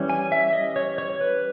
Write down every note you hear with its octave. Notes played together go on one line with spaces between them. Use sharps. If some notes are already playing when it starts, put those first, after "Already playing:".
Already playing: E3 G3 C#4
G#5
E5
D#5
C#5
C#5
B4